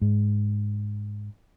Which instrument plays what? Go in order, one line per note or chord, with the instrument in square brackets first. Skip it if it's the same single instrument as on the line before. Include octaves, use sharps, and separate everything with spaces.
[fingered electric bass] G#2